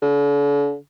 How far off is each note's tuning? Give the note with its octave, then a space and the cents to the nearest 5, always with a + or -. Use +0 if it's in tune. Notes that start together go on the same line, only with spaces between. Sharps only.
D3 -45